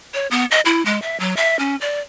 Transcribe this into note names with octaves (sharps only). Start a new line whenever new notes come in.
C#5
B3
D#5
E4
G#3
E5
F#3
E5
C#4
D5